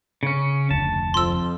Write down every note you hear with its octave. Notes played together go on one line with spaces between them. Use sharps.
C#3 C#4
F1 D2 A5
F2 F3 C6 E6